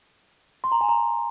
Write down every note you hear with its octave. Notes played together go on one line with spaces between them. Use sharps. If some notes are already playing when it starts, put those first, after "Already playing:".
C6
A#5
G#5
A#5